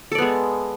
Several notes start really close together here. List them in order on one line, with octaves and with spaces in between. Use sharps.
A4 D5 B3 G#3